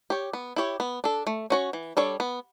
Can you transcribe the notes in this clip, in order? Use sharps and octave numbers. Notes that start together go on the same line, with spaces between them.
G4 C#5
B3
E4 G4 C#5
B3
D4 A4
A3
C#4 F#4 C#5
E3
G3 D4 A4 C#5
B3